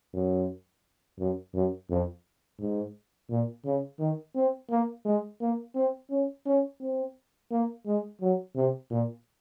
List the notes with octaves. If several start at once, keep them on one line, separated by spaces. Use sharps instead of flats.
F#2
F#2
F#2
F2
G#2
A#2
C#3
D#3
C4
A#3
G#3
A#3
C4
C#4
C#4
C4
A#3
G#3
F#3
C3
A#2